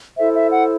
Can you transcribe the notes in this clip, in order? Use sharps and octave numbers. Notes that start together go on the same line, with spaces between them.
E4 A4 C5 E5
E5
F#5